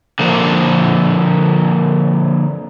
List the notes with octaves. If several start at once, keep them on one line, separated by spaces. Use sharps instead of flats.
D3 F3 A#3